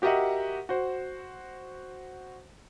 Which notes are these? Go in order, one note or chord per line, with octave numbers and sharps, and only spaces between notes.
F#4 G4 A#4 D#5 E5 F#5
F#4 C5